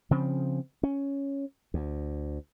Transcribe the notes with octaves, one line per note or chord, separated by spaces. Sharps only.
C#3 F3 C4
C#4
D2